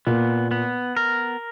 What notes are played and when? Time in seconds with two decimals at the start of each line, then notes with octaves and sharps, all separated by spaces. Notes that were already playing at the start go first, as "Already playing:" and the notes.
0.07 A#2 B3
0.51 B3
0.97 A#4